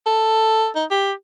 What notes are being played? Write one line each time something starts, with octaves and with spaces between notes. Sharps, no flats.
A4
D#4
G4